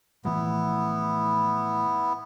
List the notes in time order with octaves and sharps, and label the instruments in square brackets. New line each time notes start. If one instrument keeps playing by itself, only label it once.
[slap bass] A2 E3 F3 [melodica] B3 E4